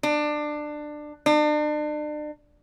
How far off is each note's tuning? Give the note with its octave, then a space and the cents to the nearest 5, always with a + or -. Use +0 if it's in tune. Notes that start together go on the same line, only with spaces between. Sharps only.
D4 +20
D4 +40